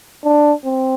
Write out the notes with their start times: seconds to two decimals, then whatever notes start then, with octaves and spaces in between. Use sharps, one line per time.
0.24 D4
0.65 C4